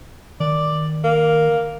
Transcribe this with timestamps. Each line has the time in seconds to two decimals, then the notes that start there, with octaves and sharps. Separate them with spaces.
0.40 D#3 D5
1.04 A#3